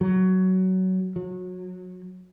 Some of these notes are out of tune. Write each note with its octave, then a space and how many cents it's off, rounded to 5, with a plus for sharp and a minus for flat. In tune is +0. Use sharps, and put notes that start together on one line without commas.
F#3 +15
F#3 -25